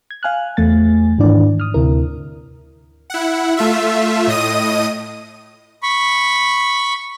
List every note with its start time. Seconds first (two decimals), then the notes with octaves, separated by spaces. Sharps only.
0.11 G#6
0.23 F5 G#5 F6 F#6
0.57 E2 A3 G#5 A6
1.18 G#2 D#3 E3 D4 D5
1.60 D#6 F6
1.74 D2 C3 E4 A#4
3.10 E4 F#5
3.57 A3 F4 E5
4.27 A2 D#5 D#6 D#7
5.83 B5 C#6